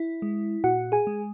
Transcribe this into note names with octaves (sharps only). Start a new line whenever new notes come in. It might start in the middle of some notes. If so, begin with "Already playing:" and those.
Already playing: E4
G#3
A#2 F#4 F#5
G#4 G#5
G#3